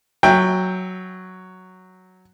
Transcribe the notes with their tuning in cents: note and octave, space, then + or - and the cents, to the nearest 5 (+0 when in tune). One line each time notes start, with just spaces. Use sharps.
F#3 +0 E5 +0 G5 +10